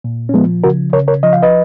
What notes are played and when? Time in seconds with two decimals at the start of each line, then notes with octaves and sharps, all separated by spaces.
0.04 A#2
0.29 C#4
0.34 F3 G#3 B3
0.64 C#3 F#4 A#4
0.93 C#3 A#4 C#5
1.08 A#4 C#5
1.23 F3 D#5
1.33 F5
1.43 B4 D#5